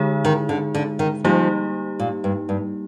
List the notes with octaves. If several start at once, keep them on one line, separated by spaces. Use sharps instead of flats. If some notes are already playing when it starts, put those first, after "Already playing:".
Already playing: D3 G#3 D#4 G#4
D#3
D3
D3
D#3
F3 G3 A#3 D#4 G4
A#2
G2
G2